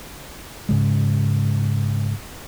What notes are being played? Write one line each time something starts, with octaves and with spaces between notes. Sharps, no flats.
G#2 C#3 G#3